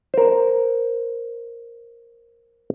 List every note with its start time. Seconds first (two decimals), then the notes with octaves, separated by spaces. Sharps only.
0.14 A#4 C5